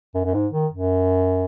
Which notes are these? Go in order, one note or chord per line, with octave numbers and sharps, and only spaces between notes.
F#2
F#2
G#2
D#3
F#2